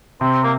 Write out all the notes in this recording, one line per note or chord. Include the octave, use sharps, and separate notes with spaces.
C3 C4
A#3